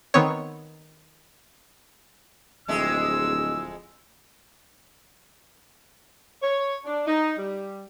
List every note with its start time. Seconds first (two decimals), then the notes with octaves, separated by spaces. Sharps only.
0.14 D#3 B3 C4 C#5
2.68 D1 F2 G#3 E5 E6
6.42 C#5
6.85 D4
7.07 D#4
7.38 G3